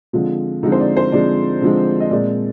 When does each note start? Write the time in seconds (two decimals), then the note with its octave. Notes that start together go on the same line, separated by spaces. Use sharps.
0.13 D3 F3 G#3 C4 F4
0.63 D3 F3 G#3 C4 D#4
0.72 C5
0.80 D5
0.97 C5
1.12 D3 F3 G#3 C4 D5
1.62 D3 F3 G#3 C4
2.00 D#5
2.11 A#2 G#3 C4 D5